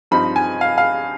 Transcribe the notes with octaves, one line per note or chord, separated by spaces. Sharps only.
G2 F3 C4 D#4 B5
G#5
F5
F5